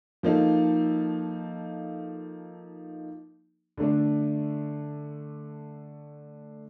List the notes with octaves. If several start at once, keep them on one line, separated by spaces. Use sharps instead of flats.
F3 A#3 D#4 A4
D3 A3 D4